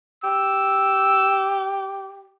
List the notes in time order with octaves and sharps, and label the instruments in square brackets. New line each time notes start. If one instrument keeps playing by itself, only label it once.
[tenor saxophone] G4 [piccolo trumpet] E6